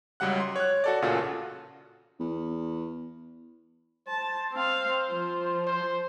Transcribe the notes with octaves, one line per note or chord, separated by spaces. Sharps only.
C#2 F#3 G3 F#5 F#6
C6
C#5 F#6
F#4 A4 D5
A1 A#2 C#3 F4 F#4 A4
E2
C5 A5
C4 F5
F3
C5